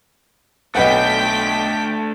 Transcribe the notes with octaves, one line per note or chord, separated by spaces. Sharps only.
B1 A3 D4 B4 F#5 G5 B6